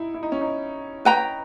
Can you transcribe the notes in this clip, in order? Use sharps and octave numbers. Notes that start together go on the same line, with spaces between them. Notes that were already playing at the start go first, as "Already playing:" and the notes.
Already playing: D#4 E4
E4
D#4
C#4
D#4
B4 G5 A#5